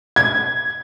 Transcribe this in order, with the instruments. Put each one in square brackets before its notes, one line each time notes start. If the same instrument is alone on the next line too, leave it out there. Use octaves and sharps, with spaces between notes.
[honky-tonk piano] G#6